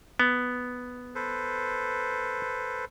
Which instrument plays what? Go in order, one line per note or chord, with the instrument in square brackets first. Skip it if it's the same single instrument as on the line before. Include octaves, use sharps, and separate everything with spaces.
[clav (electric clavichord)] B3
[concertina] A4 B4 C5